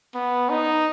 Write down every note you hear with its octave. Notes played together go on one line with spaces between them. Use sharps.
B3
D#4